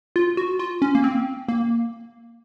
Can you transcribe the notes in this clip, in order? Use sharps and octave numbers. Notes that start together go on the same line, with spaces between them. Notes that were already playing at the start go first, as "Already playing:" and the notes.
F4
F#4
F4
C#4
A#3
C4
A#3